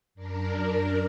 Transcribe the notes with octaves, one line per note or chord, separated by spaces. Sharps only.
F#2 D4 A#4